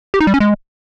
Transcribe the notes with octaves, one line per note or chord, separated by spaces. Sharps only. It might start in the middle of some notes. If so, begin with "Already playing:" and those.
G4
D#4
G3
C#4
G#3